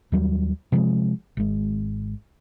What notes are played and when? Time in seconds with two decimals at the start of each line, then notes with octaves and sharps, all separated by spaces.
0.12 D#2 F#3 G3
0.72 C3 F3 F#3 G#3
1.37 G#1 G#3